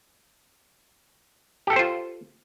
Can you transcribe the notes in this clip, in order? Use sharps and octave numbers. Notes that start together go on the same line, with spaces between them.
F4 G4 A4 C5 G5